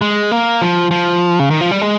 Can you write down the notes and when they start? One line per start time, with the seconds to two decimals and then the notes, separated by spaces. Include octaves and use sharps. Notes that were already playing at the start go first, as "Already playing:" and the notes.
0.01 G#3
0.31 A#3
0.62 F3
0.91 F3
1.39 C#3
1.50 D#3
1.61 F3
1.71 G3
1.81 G#3